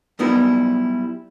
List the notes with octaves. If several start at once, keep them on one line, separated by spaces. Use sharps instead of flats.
F#3 G3 B3 D#4 E4 A#4